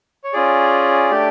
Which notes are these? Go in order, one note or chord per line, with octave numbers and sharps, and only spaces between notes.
C#5
C#4 F4 G#4 D5
A3 D4 G4